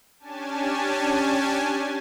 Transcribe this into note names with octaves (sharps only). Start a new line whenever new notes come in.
C#4 D4 G4 G#5 A5